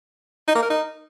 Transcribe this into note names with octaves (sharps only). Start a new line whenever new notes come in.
D#4
A#3
A#4
D#4